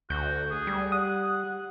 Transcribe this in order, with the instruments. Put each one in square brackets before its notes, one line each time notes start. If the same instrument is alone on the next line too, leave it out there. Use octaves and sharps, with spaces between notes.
[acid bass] D2 [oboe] F#4 [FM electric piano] G6
[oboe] G#4
[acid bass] G3
[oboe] F#5 [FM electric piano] D#6